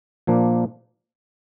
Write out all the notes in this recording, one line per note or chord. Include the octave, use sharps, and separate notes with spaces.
A#2 F3 A#3 D4